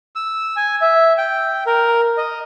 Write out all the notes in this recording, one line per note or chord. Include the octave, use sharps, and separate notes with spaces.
E6
G#5
E5
G5
A#4
D#5